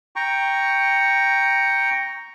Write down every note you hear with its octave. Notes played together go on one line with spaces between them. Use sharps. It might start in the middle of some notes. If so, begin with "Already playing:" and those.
G5 A#5 C#6